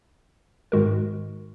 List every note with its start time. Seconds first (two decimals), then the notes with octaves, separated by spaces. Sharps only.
0.72 G#2 D#3 G#3 F#4 A#4